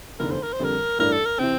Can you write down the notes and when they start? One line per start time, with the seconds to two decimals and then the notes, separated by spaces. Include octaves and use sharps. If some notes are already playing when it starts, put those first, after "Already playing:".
0.19 F1 E2 D3 A#4
0.31 C5
0.43 A#4
0.53 C5
0.60 F2 D3 G3 A#4
0.99 A1 G2 E3 A3 D4 A#4
1.12 A4
1.26 A#4
1.39 C3 E3 C4